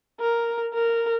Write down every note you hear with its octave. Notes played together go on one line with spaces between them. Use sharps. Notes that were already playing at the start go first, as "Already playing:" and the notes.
A#4
A#4